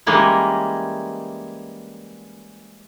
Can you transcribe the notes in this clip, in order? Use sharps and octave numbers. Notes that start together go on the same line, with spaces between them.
E3 G3 G#3 A#3 C#4